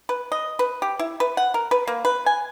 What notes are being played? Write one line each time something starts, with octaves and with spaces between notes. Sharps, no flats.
B4
D#5
B4
G4
E4
B4
F#5
A#4
B4
A#3
B4
G#5